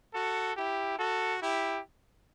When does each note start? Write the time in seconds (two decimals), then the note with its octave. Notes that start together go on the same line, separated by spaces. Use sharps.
0.13 F#4 A4
0.55 E4 G4
0.98 F#4 A4
1.41 E4 G4